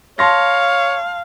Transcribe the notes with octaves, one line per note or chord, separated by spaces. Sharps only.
C#5 F5 A5 C6 A#6